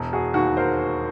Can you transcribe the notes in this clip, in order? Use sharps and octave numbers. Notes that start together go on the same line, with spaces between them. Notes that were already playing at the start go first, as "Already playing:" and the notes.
Already playing: E1
F#4 G#4
D#2 D#3 F#4
A#4 C5